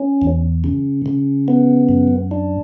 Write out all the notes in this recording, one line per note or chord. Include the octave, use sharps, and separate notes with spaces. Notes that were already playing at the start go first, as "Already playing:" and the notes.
Already playing: C#4
E2
C#3
C#3
B3
F#2
D4